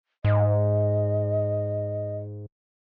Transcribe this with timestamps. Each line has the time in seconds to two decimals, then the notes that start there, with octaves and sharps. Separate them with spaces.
0.25 G#2 D#5